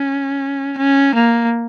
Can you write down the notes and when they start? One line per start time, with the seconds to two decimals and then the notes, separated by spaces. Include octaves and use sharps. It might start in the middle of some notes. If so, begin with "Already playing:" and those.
Already playing: C#4
0.78 C#4
1.15 A#3